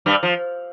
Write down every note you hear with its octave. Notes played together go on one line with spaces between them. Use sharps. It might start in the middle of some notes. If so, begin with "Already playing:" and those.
G2 G3
F3